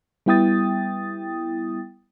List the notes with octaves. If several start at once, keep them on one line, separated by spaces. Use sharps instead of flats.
G3 B3 E4 G5 D#6 A6